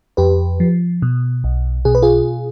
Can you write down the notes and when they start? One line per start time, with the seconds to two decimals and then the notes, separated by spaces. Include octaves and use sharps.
0.17 F2 G4 B4
0.60 F3
1.02 B2
1.44 B1
1.85 B2 G#4
1.95 B4
2.02 F4 G#4